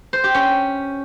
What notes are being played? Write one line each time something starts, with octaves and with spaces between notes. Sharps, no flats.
C5
G4
C#4